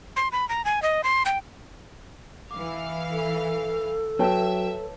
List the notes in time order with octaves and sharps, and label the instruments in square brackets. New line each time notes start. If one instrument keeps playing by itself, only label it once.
[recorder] C6
B5
A#5
G#5
D#5
C6
G5
[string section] E3 F5 [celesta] D6
[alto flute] A4
[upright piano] F#3 G5 [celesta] B4 C#5 A5 [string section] E5